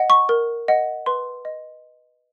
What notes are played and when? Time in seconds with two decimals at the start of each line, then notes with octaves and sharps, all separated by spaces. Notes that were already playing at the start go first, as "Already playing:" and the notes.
Already playing: D#5 F#5
0.10 C#6
0.29 A#4
0.68 D#5 F#5
1.06 B4 C6
1.45 D#5